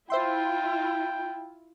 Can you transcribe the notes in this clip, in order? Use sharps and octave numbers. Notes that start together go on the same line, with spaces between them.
E4 F4 C5 E5 G5 C6